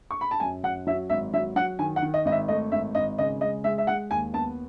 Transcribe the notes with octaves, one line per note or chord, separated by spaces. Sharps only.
C#6
B5
A5
F#2 G#5
F#2 F#5
F#3 E5
G#1 E5
F#3 E5
F#3 F#5
D#3 G#5
F#5
D#3
D#5
G#1 D#5
E5
A3 D#5
G#1 E5
G#1 D#5
C#3 D#5
G#3 D#5
G#3 E5
E5
G#3 F#5
D#2 G#5
B3 A5